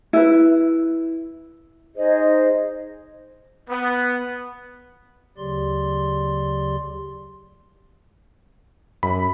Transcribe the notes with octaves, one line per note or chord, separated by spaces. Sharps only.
E4 B4
D#4 G#4 C5 D#5
B3
D2 C#3 F#3 G4 D5 C6
F#2 B5